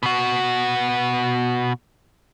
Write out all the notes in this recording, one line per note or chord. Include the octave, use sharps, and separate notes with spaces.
B2 F#4